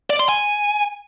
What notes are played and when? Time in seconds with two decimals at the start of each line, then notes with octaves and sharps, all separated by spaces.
0.10 D5
0.19 C6
0.29 G#5